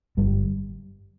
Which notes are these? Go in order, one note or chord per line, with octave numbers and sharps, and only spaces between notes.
G1 G2 G3